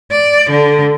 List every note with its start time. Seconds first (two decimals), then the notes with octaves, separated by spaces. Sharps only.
0.11 D5
0.50 D3